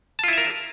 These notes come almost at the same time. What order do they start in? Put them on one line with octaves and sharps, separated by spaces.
A5 F4 E4 E5 A#4